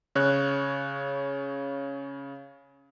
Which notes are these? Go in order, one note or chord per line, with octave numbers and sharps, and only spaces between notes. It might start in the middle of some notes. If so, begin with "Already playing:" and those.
C#3 C#5 F#6